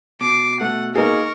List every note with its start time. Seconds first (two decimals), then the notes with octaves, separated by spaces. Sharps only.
0.21 B2 D6 C7
0.61 A3 F#5
0.95 A#3 D#4 G#4 A#4 C#6